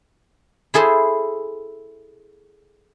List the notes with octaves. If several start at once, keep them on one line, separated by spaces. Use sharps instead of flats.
E4 G#4 A4 C5